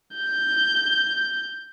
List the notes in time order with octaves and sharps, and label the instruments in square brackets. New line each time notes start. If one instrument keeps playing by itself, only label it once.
[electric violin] G6